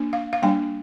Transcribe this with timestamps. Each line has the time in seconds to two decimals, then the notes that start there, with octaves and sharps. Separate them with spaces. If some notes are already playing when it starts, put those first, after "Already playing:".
Already playing: A#3 D4
0.13 F5
0.33 F5
0.42 G3 A#3 D4 G5